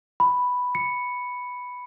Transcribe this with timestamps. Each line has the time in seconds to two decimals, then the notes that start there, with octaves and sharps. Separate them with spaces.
0.20 B5
0.75 C#7